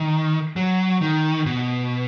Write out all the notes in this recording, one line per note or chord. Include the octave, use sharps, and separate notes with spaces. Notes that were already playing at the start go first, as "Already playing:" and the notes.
Already playing: D#3
F#3
D#3
B2